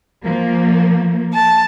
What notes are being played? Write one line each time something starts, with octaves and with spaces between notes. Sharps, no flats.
F3 A#3
A5